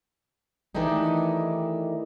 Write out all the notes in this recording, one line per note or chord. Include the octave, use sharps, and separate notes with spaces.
D#3 E3 A3 D4 D#4 G4